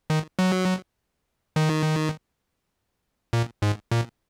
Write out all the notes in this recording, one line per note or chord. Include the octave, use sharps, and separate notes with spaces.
D#3
F#3
D#3
A#2
G#2
A#2